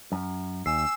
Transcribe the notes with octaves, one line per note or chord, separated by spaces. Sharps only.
F#2
D#2 G#5 E6 C7